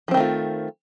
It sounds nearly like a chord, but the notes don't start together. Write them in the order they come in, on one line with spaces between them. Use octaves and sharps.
F3 C4 D#3 A3 F4